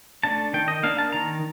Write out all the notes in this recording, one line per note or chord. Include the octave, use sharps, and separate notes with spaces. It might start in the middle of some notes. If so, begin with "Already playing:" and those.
A3 D4 A5
D#3 G5
D#5
A#3 D4 F5
A5
D#3 A#5